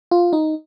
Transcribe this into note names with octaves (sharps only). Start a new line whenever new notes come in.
F4
D#4